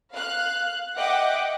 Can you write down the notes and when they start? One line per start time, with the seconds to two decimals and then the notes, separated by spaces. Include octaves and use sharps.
0.12 F5 F#6
0.97 D#5 E5 F#5 G5 D6